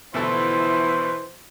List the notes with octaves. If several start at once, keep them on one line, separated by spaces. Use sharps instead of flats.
D2 B2 E3 F3 B3 E4 A4 C5